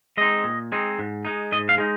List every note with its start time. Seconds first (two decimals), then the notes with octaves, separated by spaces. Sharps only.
0.17 G#3 C4 D#4 D#5
0.44 A#2
0.72 G#3 C4 D#4
0.99 G#2
1.25 G#3 D#4
1.52 G#2 D#5
1.69 F5
1.78 G#3 D#4